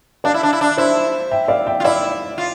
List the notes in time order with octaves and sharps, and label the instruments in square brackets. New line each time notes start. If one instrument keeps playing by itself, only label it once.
[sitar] D4 [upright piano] D5 F5
[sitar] E4
D4
E4
D4
[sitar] E4 [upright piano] C5 E5
[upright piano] E5 G5
D5 F5
E5 G5
[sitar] F4
[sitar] E4 [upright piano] D5 F5
[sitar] F4